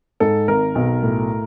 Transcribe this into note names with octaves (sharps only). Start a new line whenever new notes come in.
G#2 A4
G#1 A#4
B1
A2